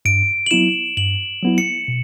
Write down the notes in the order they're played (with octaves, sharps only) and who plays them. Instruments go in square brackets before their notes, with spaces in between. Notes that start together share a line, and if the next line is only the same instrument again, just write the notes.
[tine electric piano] G2 [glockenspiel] D7
[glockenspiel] F#7
[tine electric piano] F#3 B3 E4 [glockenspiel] E7
[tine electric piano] G2 [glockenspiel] F#7
[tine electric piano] F#3 B3 E4
[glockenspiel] C#7
[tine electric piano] B2